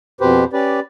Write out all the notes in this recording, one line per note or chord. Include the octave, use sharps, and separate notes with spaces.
F2 B2 G4 B4 C5
C#4 G4 B4 D5